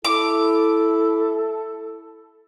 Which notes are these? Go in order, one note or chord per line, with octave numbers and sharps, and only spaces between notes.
E4 A4 D6